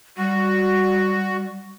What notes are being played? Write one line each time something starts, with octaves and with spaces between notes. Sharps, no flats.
G3 F#4